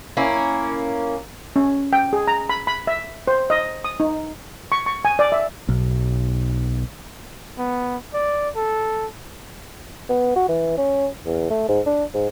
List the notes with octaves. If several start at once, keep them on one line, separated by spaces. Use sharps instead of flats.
A#3 C#4 E4
C#4
G5
G#4
A#5
B5
B5
E5
C5
D#5
D#6
D#4
C#6
C#6
G#5
D5
E5
B1
B3
D5
A4
B3
F#4
E3
C#4
E2
A3
G#2
D4
G#2